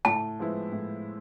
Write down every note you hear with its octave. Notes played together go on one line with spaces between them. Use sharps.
A2 A5
F3 G#3 B3 E4
A2